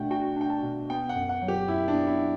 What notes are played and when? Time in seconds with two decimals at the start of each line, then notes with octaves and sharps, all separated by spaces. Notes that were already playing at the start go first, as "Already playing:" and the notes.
Already playing: B2 A3 D4 D5 F#5 G5
0.10 F#4 G5
0.36 D4 G5
0.50 A5
0.63 B2
0.89 B3 G5
1.09 F#5
1.15 F#2
1.29 F#5
1.42 F#3
1.48 G4
1.68 F#2 E4
1.88 D4
1.94 B3
2.07 E4